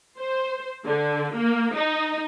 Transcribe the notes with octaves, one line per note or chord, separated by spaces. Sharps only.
C5
D3
A#3
D#4